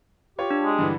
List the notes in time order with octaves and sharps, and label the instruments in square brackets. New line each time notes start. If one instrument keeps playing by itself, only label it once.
[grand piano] F4 C#5 [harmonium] G4
[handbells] D4
[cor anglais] G#3
[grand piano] G2 D3 E3